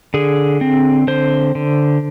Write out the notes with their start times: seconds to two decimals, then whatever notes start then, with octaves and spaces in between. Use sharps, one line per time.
0.14 D3 G#4
0.61 C4
1.08 D3 C5
1.55 D3